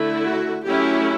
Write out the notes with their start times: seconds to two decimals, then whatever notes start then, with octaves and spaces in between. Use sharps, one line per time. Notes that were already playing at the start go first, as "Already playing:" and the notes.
Already playing: D3 A3 E4
0.25 F#4
0.66 F#3 A3 C#4 E4 G4